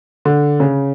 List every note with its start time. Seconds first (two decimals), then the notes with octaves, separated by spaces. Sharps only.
0.25 D3
0.60 C#3